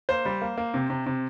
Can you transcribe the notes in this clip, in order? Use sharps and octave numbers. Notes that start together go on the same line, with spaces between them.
A#3 C5
G3
A#3
A#3
C3
C3
C3